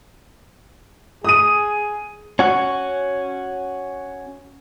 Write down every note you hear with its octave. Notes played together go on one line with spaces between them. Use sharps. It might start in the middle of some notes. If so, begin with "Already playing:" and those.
G#4 D#6 D#7
C#4 F#4